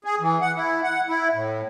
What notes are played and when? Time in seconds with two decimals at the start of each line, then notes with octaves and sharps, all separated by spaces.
0.04 G#4
0.20 E3
0.41 F#5
0.56 E4
0.83 F#5
1.09 E4
1.34 A2